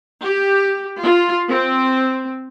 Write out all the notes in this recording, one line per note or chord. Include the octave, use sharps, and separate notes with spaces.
G4
F4
C4